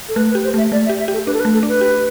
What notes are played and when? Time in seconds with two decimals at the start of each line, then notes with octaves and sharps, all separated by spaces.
0.09 A4
0.16 A3 B4
0.30 B4
0.35 G4
0.44 C5
0.54 A3 E5
0.72 A3 D5
0.86 E5
0.89 G4
1.00 E5
1.08 G4
1.13 A4
1.27 D4 B4
1.33 A4
1.40 B4
1.45 A3
1.54 A4
1.63 D4
1.68 B4
1.81 G4